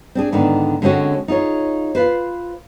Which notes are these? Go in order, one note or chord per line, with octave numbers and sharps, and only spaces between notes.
C4 D4 G#4
G#2 D3 D#3 B3 D4
D3 G#3 C4 C#4 F#4
D#4 F4 G#4 C#5
F4 B4 C5